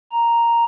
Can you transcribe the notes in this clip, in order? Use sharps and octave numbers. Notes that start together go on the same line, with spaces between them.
A#5